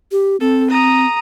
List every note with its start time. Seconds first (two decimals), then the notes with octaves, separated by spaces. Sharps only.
0.12 G4
0.40 C4 A4
0.70 A#5 D#6